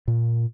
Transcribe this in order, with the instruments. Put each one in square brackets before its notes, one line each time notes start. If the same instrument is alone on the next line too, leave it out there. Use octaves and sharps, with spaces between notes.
[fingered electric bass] A#2